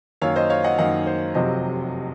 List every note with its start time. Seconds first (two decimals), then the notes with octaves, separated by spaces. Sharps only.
0.22 F#2 D#3 A#3 C#5 F5
0.36 C5 D#5
0.50 C#5 F5
0.64 D#5 F#5
0.78 F#2 D#3 A#3 D#5 F#5
1.07 C5
1.34 F1 F2 C3 F#3 C5 D#5